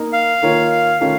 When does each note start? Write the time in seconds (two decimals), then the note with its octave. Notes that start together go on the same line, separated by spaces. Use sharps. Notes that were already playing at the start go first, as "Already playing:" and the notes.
Already playing: A#3 D#4 A#4
0.13 F5
0.42 D#3 A#3 F4 A#4 C#5
1.00 D#3 A3 C#4 F4 A#4 F5